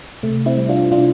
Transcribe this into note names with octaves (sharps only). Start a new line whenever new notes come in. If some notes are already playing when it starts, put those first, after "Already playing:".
C3 A3
C4 E4
G3
D4 F4
C3 D4 F4